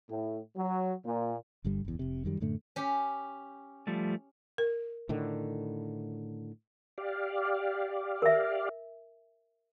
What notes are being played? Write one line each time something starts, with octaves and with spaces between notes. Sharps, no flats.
A2
F#3
A#2
G1 G2 D3 G3
F#1 E2
F1 C3
F#2 D#3 G3
F#2 A2 D3 A3
C#4 G4
F3 G3 A3
A#4
A2 D3 D#3
G4 D5 F5
A#4 E5